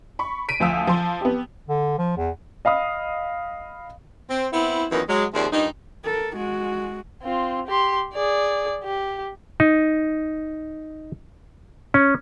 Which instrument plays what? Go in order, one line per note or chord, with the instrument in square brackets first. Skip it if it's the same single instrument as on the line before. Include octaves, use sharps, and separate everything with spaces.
[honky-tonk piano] B5 C#6
B6 D7 D#7
D2 F3 F5 D#6 E6
F3 C6
B3 G4
[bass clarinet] D3
F3
E2
[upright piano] D#5 F5 B5 D#6
[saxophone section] C4
B3 C4 E4
F#2 A#2 D#3 E3 B3
F#3 G#3
D#2 C3 F3 G#4 D5
G2 A#2 D#4
[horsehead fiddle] A4 A#4
G#3 F#4
[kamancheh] C4 F4
G4 C6
G#4 D5
G4
[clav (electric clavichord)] D#4
C#4